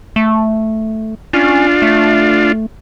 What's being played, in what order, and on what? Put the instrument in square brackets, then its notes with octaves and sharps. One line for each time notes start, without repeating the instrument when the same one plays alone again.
[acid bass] A3
[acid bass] C#4 [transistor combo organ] D4 F4
[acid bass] A3